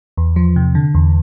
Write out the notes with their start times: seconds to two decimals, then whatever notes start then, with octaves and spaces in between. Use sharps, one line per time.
0.17 E2
0.36 F3
0.56 C3
0.75 D3
0.95 E2